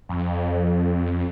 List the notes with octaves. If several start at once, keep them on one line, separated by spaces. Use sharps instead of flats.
F2